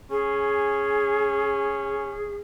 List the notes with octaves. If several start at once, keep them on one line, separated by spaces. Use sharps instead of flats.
C#4 G#4